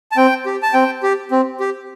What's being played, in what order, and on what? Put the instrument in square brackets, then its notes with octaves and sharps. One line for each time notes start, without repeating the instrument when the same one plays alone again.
[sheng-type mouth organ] A5
C4 G5
G4
A5
C4 G5
G4
C4
G4